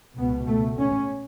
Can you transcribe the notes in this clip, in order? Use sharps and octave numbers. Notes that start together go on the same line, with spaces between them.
C#2 B2 B3
A3
C#4